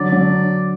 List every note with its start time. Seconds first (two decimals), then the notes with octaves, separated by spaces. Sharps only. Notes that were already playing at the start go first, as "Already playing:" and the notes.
Already playing: D3 F#3 D5
0.12 D3 F#3